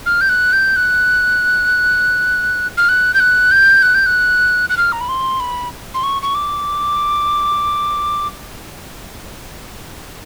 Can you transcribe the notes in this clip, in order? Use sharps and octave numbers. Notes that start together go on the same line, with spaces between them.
F6
G6
F#6
G6
F#6
F6
F#6
G6
F#6
G6
F#6
G6
F#6
F#6
F6
A#5
B5
C6
B5
C6
C#6
C#6
D6